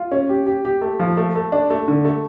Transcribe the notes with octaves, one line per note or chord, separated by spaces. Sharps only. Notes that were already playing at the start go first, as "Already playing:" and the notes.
Already playing: F4
C#4
G4
G4
G4
A3
F3
A3
A3
D4
A3
D3
A3